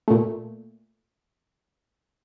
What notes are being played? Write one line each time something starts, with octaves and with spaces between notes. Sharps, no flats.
A#2 A3